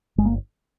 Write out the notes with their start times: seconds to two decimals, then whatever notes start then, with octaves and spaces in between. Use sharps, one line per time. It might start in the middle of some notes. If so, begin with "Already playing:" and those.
0.18 G1 G#3
0.25 A#3